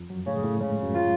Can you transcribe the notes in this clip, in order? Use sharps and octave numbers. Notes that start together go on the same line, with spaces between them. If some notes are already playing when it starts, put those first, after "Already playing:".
Already playing: F2 F3
F#2 F#3
A2 C#3 A3
A2 A3
G#2 C#3 G#3
F#2 F#3
F4